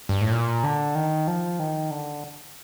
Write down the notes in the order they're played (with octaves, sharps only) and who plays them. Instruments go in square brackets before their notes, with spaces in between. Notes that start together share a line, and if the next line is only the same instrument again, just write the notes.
[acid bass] G2
A2
A#2
D3
D#3
F3
D#3
D3